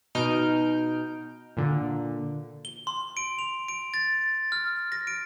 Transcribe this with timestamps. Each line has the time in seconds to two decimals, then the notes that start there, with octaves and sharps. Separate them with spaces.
0.15 B2 D#4 F6 G6 D7
1.57 A#2 D3
2.65 G7
2.87 C6
3.17 D7
3.39 F7
3.68 D7
3.94 A6
4.52 F6
4.92 A#6
5.07 D7